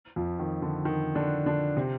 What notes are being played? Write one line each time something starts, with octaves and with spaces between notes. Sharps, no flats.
F2 F3
D#3
D3
D#3
D3 D4
D3 D4
C3 C4